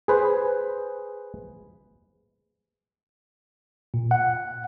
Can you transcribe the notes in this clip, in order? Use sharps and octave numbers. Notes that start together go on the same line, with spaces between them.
G#4 B4 C5
A#2
F#5